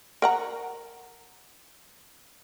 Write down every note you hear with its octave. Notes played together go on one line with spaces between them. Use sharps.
A#4 F#5 A#5